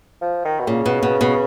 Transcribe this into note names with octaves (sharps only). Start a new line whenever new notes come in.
F3
D#3
B2
A#2 C#3
B2
B2
B2